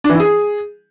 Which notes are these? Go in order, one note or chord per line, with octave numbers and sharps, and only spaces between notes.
D4
E3
E4
G#4